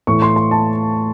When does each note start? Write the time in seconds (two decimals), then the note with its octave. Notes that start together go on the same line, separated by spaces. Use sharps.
0.07 A2 E3 A3 C#6
0.22 C6
0.36 C6
0.51 A5